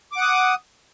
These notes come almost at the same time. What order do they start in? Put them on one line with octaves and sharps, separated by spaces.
D6 F#5 D#6